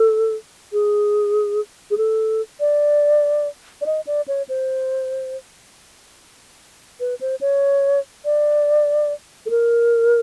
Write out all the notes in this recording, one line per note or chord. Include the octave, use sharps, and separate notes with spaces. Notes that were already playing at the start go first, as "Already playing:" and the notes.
Already playing: A4
G#4
G#4
A4
D5
D5
D#5
D5
C#5
C5
B4
C5
C#5
D5
A4
A#4